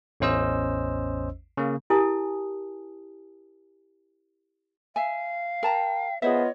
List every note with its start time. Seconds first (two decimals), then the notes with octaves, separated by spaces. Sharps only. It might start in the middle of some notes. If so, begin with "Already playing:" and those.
0.20 A1 E2 C#4 C5 D#5 E6
1.57 C#3 A#3
1.90 E4 G4 A#4 G#5 A5 D#6
4.96 E5 F5 G#5
5.63 A#4 G5 A5 A#5
6.22 B3 F4 G#4 C5 C#5 D#5 E5